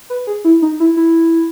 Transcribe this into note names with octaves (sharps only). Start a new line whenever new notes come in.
B4
G#4
E4
D#4
E4
E4